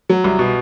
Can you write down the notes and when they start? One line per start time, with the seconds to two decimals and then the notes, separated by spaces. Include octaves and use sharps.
0.09 F#3
0.24 C2
0.39 B2